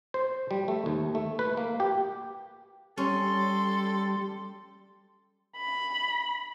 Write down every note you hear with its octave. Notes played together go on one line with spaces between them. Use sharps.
C5
G3
A3
D#2
A3
B4
A#3
G4
G3 C#4 A4 C6
B5